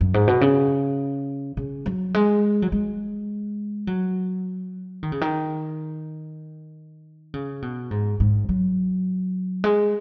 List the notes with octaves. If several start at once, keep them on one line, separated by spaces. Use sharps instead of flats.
F#2
G#2
B2
C#3
C#3
F#3
G#3
F#3
G#3
F#3
D#3
C#3
D#3
C#3
B2
G#2
G#2
F#3
G#3